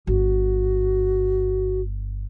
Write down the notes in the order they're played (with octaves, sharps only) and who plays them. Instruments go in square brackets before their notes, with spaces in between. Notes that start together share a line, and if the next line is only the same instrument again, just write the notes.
[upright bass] G1 [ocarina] F#4